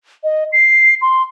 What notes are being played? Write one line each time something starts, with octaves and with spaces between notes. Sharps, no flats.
D#5
C7
C6